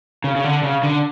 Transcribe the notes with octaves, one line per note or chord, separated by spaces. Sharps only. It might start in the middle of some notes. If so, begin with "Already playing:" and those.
C#3
C#3
D3
C#3
D3